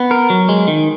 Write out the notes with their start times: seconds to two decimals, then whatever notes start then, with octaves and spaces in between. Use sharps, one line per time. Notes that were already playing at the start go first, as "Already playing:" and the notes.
Already playing: B3
0.11 A#4
0.30 F#3
0.49 G#3
0.68 D#3